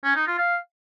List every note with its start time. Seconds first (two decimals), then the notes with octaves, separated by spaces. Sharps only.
0.04 C#4
0.15 D#4
0.27 F4
0.38 F5